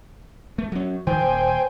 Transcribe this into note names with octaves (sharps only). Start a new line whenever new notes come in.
A3
F#3 C#4
D#3 C5 G5 G#5
D#1